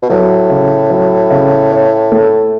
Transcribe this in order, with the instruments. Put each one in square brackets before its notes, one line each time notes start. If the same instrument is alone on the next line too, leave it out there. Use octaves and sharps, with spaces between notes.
[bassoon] B2
[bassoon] A2 [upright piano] F#3
[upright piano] C#3
F#3
C#3
C#5
A3